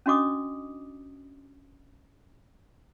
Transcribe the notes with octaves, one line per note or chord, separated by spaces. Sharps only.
C#4 D4 F#4 D#5 D6 D#6